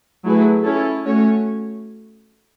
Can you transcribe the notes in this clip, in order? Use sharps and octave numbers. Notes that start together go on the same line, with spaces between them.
F#3 A3 E4 G#4 B4
C#4 E4 A4 C#5
A3 C#4 F#4 C#5